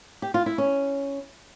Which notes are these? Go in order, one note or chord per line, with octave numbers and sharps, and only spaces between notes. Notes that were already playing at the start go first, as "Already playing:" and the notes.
G4
F4
E4
C#4